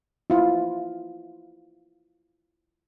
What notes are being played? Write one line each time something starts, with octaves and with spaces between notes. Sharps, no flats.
E4 F4